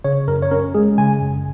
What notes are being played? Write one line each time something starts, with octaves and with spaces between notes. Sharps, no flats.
C#3 C#5
F#2 A#4
C#5
C#4 A#4
G#3 G#4
C#3 G#5
F#2